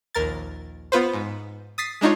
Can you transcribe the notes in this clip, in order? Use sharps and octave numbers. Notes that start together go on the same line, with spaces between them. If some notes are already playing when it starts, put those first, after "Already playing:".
A#1 D#2 A#4 A6
B3 F4 B4 C5
G#2
D#6 A6 B6 C7
G#3 D4 D#4 F4 C#5